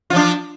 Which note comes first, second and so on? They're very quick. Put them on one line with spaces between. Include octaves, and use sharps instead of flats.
F4 F3 D4